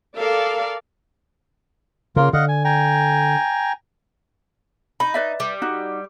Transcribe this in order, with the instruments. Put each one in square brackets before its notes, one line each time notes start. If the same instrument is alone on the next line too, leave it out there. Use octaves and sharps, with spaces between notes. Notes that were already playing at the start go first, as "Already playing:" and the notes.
[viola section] A4 A#4 D5 F5
[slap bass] C#3 [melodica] A#3 F4 A#4
[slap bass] D3 [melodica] D#5 F5 F#5
[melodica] G#5
G5 G#5 A#5
[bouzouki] D#4 [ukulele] B5
[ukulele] B4 D5 E5
[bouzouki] G3
[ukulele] D#4 F#4